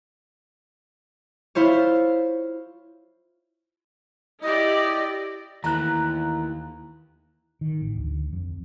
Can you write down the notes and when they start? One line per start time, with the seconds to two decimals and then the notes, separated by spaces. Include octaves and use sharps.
1.55 E4 F4 C5 C#5
4.43 E4 G4 D5 D#5
5.64 D#2 E3 A3 B4 A#5 F#6
7.61 D#3
7.82 A1
7.96 D2
8.33 F2